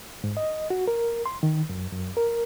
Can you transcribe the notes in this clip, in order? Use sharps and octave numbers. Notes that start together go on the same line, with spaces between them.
G#2
D#5
F#4
A#4
C6
D#3
F#2
F#2
A#4